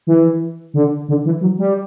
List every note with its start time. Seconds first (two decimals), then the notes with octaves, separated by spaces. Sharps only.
0.07 E3
0.74 D3
1.08 D3
1.25 E3
1.41 F#3
1.58 G3